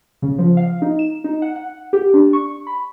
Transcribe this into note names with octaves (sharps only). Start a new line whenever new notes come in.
C#3
F3
F5
D#4
E7
D#4
F#5
F#5
G4
D4
C#6
B5